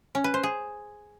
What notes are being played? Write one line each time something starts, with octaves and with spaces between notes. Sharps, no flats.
C#4
B4
C5
G#4